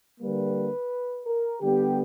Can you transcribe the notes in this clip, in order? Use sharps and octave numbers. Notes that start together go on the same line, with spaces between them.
D3 G3 A#3 B4
A#4
D3 G3 B3 G4